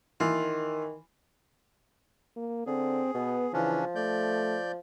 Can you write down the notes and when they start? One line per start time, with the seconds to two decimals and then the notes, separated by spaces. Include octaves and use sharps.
0.20 D#3 E3 F4
2.36 A#3
2.66 D3 C4 G#4
3.14 B2 B3
3.53 C#3 E3 F3 C#4 D4
3.95 A3 D5 G6